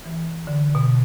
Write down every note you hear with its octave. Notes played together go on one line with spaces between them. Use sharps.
E3
D3
B2